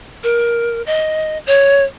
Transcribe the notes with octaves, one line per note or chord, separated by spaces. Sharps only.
A#4
D#5
C#5